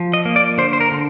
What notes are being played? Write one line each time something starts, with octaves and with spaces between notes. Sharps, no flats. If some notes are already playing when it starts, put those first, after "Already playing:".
Already playing: F3
D#5
A#3
D5
D3 C5
C5
A#4
D3